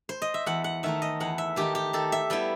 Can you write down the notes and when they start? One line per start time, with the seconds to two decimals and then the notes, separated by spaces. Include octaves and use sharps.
0.09 C5
0.22 D#5
0.34 E5
0.46 E2 F#5
0.64 F#5
0.83 D#3 A3 D#4 E5
1.02 D#5
1.20 E2 F#5
1.38 E5
1.56 D#3 A3 D#4 G4
1.75 G4
1.93 D#3 A4
2.12 E5
2.30 G3 B3 E4 G5